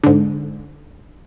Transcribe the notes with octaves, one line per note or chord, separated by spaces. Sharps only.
G#2 D3